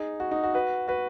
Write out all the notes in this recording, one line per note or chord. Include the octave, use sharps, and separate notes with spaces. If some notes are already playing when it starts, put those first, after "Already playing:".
Already playing: D#4 G#4
F#4
D#4
F#4
F#4 B4
F#4 B4